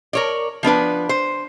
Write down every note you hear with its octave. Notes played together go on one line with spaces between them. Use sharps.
A#4 C#5 D5
F3 B3 D4 B4
C5